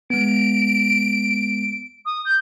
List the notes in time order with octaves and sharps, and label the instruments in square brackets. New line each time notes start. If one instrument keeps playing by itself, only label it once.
[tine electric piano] G#3 B3 [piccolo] D7
[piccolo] D#6
G6